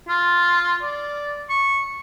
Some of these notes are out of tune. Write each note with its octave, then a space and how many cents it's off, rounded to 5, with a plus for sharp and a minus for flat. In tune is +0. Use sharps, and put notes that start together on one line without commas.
F4 +0
D5 -5
C#6 -10